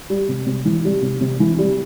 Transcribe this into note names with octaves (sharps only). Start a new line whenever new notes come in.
G3
C3
C3
E3
G3
C3
C3
E3
G3